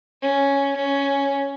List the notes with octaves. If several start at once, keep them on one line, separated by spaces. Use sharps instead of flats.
C#4
C#4